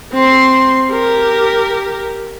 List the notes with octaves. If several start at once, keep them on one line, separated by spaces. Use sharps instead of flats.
C4 C6
G4 A#4